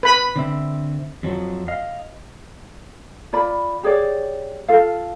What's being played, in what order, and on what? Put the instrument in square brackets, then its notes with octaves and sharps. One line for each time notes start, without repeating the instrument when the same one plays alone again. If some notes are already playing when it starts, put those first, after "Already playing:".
[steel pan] B4 B5
[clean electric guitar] D3 C4 E5
F2 F3 F#3
D#5 F5
[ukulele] F4 D5 B5
G4 G#4 C#5 D5
F4 A4 F5